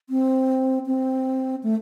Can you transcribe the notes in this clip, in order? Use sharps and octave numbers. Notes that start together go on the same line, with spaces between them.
C4
C4
A3